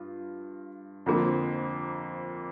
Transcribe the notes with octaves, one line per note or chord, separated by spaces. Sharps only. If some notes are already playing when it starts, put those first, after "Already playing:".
Already playing: G2 F4
F2 D3 F3 A#3